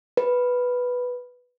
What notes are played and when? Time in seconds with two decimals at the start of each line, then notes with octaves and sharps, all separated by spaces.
0.17 B4